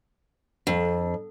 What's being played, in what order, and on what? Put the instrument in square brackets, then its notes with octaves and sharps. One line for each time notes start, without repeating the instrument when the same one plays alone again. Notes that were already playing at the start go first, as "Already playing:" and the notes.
[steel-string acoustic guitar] F2